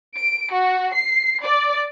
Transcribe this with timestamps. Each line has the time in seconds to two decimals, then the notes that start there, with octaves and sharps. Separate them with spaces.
0.16 D7
0.54 F#4
0.94 C7
1.43 D5